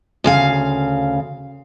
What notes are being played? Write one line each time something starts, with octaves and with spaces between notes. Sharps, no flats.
D2 C#3 F5